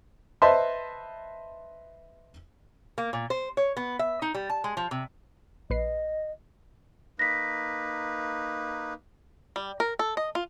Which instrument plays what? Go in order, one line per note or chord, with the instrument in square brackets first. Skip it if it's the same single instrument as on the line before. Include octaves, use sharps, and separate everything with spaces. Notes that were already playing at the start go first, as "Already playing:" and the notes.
[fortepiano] B4 C5 D#5 E5 A5 C6
[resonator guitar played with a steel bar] A#3
A#2
C5
C#5
B3
E5
D#4
G3
A5
G#3
F3
C3
[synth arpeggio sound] A#1 B4 C7 [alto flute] D#5
[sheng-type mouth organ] A#3 D#4 B4 [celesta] A#6 B6
[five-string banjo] G3
A#4
A4
D#5
F4